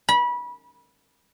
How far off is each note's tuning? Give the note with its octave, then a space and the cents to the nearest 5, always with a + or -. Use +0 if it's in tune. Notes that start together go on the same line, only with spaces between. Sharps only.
B5 -25